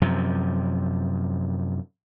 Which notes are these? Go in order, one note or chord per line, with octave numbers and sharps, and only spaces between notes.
F#2 C3 F3